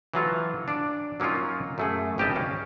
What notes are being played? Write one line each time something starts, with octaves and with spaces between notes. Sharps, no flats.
E3 F#3 F4 A4
D4 D5
F#3 A#3 C#4 D#4 F4
F#2 A3 G#4
G#1 G3 G4 B4 D#5 A5
C#4 F5